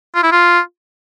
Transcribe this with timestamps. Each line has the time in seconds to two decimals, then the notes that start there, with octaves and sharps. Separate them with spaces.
0.15 F4
0.23 E4
0.31 F4